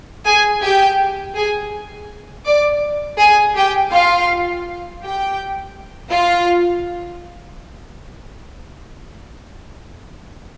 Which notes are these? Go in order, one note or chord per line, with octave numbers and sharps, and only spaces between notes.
G#4 G#5
G4 G5
G#4 G#5
D5 D6
G#4 G#5
G4 G5
F4 F5
G4 G5
F4 F5